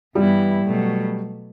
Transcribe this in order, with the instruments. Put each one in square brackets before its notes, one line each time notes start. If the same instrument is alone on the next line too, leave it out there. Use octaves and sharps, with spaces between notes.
[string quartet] G2 E3 B3 E4 [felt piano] G3
[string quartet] B2 F#3 A3